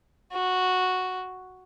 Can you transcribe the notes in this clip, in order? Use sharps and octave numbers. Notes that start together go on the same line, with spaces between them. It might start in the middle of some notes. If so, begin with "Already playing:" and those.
F#4